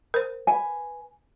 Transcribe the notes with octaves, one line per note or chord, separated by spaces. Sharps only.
A#4 C5
B4 G#5